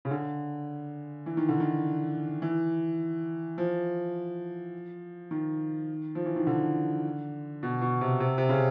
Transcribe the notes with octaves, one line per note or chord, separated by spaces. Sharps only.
C#3
D3
E3
D#3
D3
D#3
E3
F3
D#3
F3
E3
D#3
D3
B2
B2
C3
C3
C3
C#3